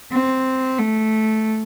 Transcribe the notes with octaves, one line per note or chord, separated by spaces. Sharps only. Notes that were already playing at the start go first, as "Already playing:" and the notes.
C4
A3